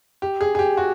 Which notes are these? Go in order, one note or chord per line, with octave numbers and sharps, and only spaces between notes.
G4
G#4
G#4
G4
F#4